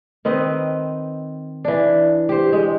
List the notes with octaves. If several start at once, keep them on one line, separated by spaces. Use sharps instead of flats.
D#3 C4 B4 D#5
E3 D4
G4 C5
G#3